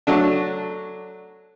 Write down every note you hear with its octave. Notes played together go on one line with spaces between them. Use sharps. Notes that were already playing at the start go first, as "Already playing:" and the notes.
F#3 A3 D4